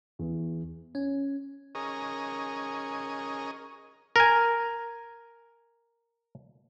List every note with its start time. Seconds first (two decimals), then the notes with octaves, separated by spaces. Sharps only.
0.19 E2
0.95 C#4
1.75 C#4 G#4 A#4 D#5
4.16 A#4 G#5